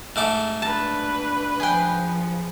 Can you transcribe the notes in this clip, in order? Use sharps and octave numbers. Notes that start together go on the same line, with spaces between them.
G#2 A3 D6
D4 B4 A5
F3 G#4 G5